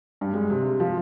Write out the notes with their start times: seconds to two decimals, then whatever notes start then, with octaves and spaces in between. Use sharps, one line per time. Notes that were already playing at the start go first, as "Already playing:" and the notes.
0.21 G2
0.34 G#3
0.50 C3
0.80 F3